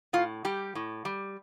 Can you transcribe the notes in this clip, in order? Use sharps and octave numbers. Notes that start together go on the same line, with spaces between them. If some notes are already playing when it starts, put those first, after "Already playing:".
A2 F4
G3 G4
A2
G3